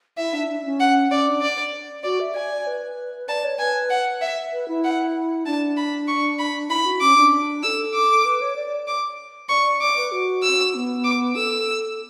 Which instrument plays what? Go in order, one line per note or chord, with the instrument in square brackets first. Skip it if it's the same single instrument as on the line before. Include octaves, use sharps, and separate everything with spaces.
[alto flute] E4 [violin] E5
[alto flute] D4
D4
D4
C#4
[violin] F#5
[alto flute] C#4 [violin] D5
[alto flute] D4
[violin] D5
[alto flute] F#4 [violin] D5
[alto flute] E5
[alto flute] D5 [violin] G#5
[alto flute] D5
B4
[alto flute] D5 [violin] A5
[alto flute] C#5
[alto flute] B4 [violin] G#5
[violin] F#5
E5
[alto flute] B4
E4
[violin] F#5
[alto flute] D4 [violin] A5
[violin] B5
C#6
B5
[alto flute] E4 [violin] B5
[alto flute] F#4
[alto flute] C#4 [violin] D6
[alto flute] D4
[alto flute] A4 [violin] E6
[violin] D6
[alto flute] B4
C#5
D5
[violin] D6
[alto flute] D5 [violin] C#6
[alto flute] D5
[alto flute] D5 [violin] D6
[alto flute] B4
F#4
[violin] E6
[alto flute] B3
[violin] D6
[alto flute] A4 [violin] E6